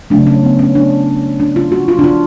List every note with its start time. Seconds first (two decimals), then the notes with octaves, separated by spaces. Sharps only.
0.10 C#3 F#3 A3 D4
0.27 C#4
0.43 B3
0.59 C#4
0.75 D4
1.40 D4
1.56 F4
1.72 F#4
1.88 F4
1.99 D4
2.04 F4